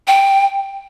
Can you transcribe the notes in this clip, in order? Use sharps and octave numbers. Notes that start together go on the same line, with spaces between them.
G5